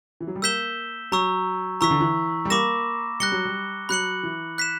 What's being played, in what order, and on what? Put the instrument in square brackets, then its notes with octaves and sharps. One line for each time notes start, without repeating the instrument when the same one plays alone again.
[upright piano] E3
F#3
G3
[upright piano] A#3 [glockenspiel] E6 G6 B6 E7 G7
[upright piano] F#3 [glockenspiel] A#5 C#6 E6
[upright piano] E3 [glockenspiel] A#5 C#6 E6 B6
[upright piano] D3
E3
G3
[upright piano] A#3 [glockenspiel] B5 D6 A#6 E7
[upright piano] G3 [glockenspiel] F#6 A#6 C#7 G7
[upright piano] F#3
G3
[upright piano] F#3 [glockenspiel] B5 F#6 C#7 F#7
[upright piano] E3
[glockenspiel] F#6 B6 E7